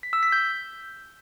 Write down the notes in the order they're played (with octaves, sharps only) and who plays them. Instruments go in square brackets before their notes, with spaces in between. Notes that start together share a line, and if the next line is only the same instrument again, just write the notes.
[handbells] B6
E6
B6
G6